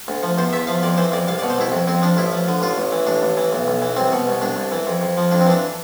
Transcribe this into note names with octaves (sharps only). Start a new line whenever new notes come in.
D2
F3
E2 C5
E2 E5
F3 F5
F2 D5
E3 C5
F2 D5
C2 F5
D5
B2
C5
C2 E4
F2
F2 C4
F3 D4
A1 E4
F3
D3
A1 F4
A1
E3
A1 D4
A1
E3
B1
B1
E3
C2 C4
B2
C2
C2 D4
C2
E3
F2
F2
F3
F2 D4
C4
E3 D4